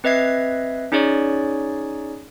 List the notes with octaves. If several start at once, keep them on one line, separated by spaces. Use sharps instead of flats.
C4 B4 D#5 E5 G#6 C7
C#4 D#4 G#4 C#5 D5